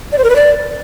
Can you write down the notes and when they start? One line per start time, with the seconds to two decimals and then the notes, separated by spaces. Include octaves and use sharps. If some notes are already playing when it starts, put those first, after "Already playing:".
0.12 D5
0.18 C5
0.24 A#4
0.30 B4
0.36 D5